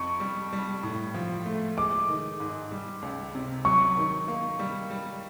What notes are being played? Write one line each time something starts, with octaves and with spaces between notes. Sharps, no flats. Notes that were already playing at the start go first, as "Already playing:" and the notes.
Already playing: F2 C#6
G3
G3
A2
F3
A3
G#3 D6
D#3
G#2
G3
C#2
C3
F#3 C#6
D#3
A#3
G3
G3